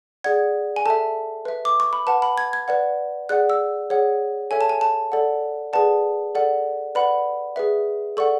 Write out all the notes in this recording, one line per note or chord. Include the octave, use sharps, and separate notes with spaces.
G#4 D5 F#5 G#6
G#5
A4 E5 A5
B4 E5
D6
C#6
B5
B4 F#5 A5
B5
G#6
G#6
B4 D5 F#5
G#4 D5 F#5 F#6
E6
G#4 C#5 F#5
A4 C#5 E5 G#5
A5
G#5
A5
A4 D5 F#5
G#4 B4 D5 F#5 A5
A4 D5 F#5
B4 D5 F#5 B5
G#4 B4 E5
A4 D5 F#5 C#6